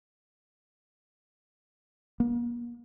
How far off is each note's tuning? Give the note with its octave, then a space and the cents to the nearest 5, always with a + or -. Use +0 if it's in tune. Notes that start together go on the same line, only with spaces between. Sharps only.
A#3 +40